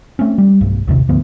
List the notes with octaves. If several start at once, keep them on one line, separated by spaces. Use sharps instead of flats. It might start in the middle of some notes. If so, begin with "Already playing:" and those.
A3 C4 C#4
G3
B1 G2
A#1 D#2 C3
D2 G#2 F3 B3